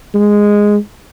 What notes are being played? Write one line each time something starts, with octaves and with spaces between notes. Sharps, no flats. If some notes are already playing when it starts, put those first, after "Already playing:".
G#3